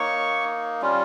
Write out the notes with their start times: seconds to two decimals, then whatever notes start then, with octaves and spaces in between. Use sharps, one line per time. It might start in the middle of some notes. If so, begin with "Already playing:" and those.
Already playing: A#3 D#4 C#5 C#6
0.82 G3 C#4 F4